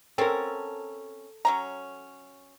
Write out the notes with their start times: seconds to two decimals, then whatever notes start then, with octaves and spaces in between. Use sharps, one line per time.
0.18 F#3 C4 C#4 A4 A#4
1.45 F#3 C#4 A#5